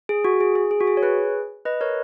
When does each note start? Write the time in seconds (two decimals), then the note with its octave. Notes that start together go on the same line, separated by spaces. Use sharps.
0.09 G#4
0.25 F#4
0.40 G#4
0.55 G#4
0.71 G#4
0.81 F#4
0.87 G#4
0.97 C#5
1.03 G#4 B4
1.65 B4 D#5
1.81 A#4 C#5